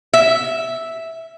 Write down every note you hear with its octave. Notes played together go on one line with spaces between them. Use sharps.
E5